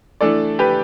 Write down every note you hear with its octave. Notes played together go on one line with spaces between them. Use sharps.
E3 A3 D4 A4 D5
G4 B4